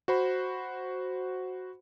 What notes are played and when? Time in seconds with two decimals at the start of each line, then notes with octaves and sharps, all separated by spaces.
0.08 F#4 C5 B5